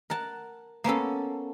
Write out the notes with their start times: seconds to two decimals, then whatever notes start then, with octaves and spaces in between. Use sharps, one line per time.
0.10 A#4 F#5 A5
0.84 A#3 B3 C#4 A4